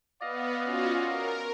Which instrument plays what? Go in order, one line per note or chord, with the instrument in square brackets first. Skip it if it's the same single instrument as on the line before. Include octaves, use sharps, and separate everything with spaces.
[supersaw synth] B3 [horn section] D5 D#5 F5
[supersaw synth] C#4 F4 F#4
A#4